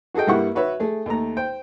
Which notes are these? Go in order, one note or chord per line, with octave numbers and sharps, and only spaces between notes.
F#4 G#4 A4 D#5 G5
G2 G3 A#3 E4 F#5 C#6
F#4 B4 C#5 E5
A3 G#4
D#2 A3 A#5
C5 G5